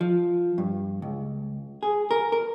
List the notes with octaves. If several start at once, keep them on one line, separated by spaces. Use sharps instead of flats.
F3
G2
C#2
G#4
A#4
A#4